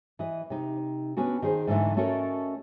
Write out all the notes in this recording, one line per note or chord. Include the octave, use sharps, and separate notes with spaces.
E3 D#5
C3 D#4
B3 C#4 D4 F#4
D#3 G#4 C5
G#2 D3 E3 A3
A3 C#4 F#4 A4 A#4 D#5